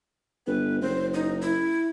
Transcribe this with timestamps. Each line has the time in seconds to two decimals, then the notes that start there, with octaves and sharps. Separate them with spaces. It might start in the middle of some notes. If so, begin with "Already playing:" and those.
0.47 G1 B4
0.82 F#1 C5
1.14 D#4
1.42 E4